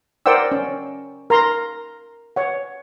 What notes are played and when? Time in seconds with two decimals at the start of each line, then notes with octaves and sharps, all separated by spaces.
0.26 A#4 C5 D5 F#5 G5 E6
0.52 C#4
1.30 A#4 A#5 C6
2.36 C#5 F#5